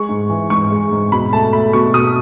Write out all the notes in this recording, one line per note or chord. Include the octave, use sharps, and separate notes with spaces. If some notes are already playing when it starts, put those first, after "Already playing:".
Already playing: G#3 C#6
G#2
E3
G#2 C#6
G#3
G#2
B2 B5
A3 A5
A3 B5
B2 C#6
B2 D#6